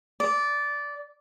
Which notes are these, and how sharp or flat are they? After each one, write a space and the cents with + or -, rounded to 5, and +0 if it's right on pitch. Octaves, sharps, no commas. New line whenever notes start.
D5 -15